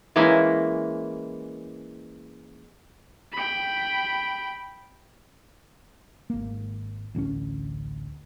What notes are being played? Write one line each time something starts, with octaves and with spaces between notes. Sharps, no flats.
E3 G#3 A#3 C#4 E4
G5 B5
G#1 A#3
A1 D2 F#3 C#4